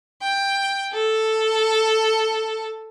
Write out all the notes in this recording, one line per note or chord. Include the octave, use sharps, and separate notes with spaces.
G5
A4